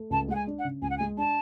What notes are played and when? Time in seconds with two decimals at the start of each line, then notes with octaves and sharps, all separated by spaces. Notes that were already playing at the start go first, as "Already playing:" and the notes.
Already playing: A3
0.10 C#2 A5
0.28 G#3 F#5
0.35 G#5
0.47 D4
0.59 F#5
0.64 C#3
0.82 C#2 G#5
0.90 F#5
0.97 G#5
1.00 G#3
1.17 D4 A5